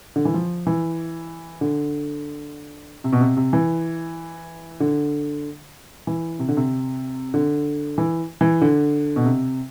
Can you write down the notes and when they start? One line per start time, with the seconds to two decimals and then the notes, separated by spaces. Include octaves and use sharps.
0.16 D3
0.25 E3
0.34 F3
0.67 E3
1.61 D3
3.04 C3
3.13 B2
3.21 C3
3.37 C3
3.53 E3
4.80 D3
6.07 E3
6.39 C3
6.48 D3
6.57 C3
7.34 D3
7.98 E3
8.41 E3
8.61 D3
9.16 B2
9.25 C3